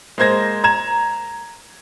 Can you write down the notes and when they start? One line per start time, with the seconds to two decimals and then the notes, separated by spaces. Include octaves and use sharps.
0.18 G#3 A#3 C5 G#6 A#6
0.64 A#5 G#6 E7